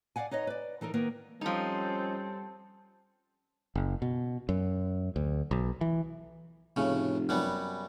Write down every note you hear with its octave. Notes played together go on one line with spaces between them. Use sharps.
D5 D#5 F5 F#5 G#5
D#4 B4 C#5 D#5
B4 D5
E3 D#4 A4 A#4
D#3 A#3 B3 A#4 B4
F3 G3 C4 C#4 D#4 A4
F#1
B2
F#2
D2
B1
E3
F1 A2 C#3
F#2 G3 B3